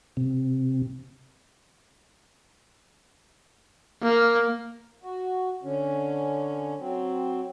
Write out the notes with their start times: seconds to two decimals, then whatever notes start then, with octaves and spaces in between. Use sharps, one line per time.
0.17 C3
4.02 A#3
5.03 F#4
5.63 D3 C#4
6.79 F#3 C4